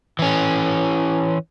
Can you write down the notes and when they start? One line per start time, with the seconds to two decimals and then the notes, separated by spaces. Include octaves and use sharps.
0.19 E3 C#4